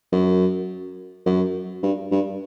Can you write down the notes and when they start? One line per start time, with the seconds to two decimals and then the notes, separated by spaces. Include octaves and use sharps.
0.12 F#2
1.26 F#2
1.83 G2
2.11 G2